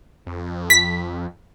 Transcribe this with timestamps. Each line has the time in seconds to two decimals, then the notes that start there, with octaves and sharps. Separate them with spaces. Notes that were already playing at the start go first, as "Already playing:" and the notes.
0.26 F2
0.70 B6